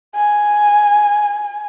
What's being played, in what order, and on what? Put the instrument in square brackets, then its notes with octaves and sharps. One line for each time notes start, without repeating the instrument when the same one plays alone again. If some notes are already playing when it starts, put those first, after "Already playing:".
[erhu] G#5